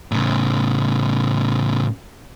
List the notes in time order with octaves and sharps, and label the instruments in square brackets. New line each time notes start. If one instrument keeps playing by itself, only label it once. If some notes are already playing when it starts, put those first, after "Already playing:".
[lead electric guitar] A2 C#3